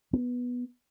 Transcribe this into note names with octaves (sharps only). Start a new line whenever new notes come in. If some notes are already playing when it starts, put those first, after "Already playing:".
B3